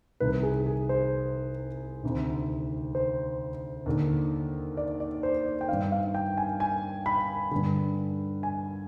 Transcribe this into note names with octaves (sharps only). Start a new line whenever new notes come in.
C2 C3 D#3 B4
G#4
G#4
C5
D2 C3 D#3
C5
D#2 D3
D5
D5
C5
D5
G5
G2 D#3 F5
F5
G5
G#5
G#5
B5
G2 D3
G#5